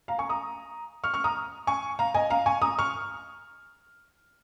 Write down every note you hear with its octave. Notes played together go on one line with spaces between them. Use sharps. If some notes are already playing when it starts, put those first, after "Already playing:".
F5 A#5
G#5 C#6
A#5 D#6
C#6 F6
C#6 F6
A#5 D#6
G#5 C#6
F5 A#5
D#5 G#5
F5 A#5
G#5 C#6
A#5 D#6
C#6 F6